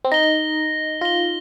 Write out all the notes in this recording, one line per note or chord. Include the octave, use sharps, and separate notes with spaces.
C4
D#4 A#6 G7
F4 A#6 G7